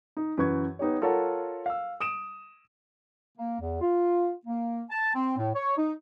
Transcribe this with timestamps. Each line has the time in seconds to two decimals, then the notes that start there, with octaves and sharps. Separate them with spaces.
0.17 D#4
0.37 F#2 E3 B4 C#6 G#6
0.79 B3 D#4 G4 C#5
1.02 F4 A4 A#4 C#5 F#5 A5
1.66 F5 E6
2.00 D#6 D7 E7
3.37 A#3
3.60 E2
3.81 F4
4.46 A#3
4.90 A5
5.14 C4
5.37 A2
5.55 C#5
5.77 D#4